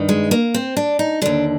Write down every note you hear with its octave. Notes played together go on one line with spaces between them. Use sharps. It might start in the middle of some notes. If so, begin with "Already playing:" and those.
Already playing: G2 D#3
G#3
A#3
C4
D4
D#4
D#2 D3 D4